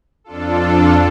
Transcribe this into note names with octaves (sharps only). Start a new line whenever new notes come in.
F2 D4 F4 A4